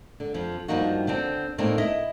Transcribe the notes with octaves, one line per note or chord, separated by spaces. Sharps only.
D3
F2 F3
G2 F3 G3 A#3 D#4 F#4
D3 B3 C4 D4
A2 A#3 C4 D4 D#4 A#4
E4 D#5